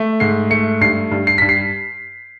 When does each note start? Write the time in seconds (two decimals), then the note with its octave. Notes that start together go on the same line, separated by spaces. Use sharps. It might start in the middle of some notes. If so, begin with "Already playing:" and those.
Already playing: A3
0.20 G#2 C7
0.50 A3 C#7
0.81 G2 C7
1.11 G2
1.27 C7
1.38 G2 B6
1.49 C7